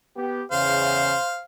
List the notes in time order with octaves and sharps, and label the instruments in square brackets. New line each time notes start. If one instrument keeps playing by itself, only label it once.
[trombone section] B3 G4
[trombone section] E2 C#3 [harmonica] C5 F5